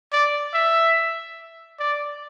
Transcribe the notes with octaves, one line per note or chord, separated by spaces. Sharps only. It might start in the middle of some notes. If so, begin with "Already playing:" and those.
D5
E5
D5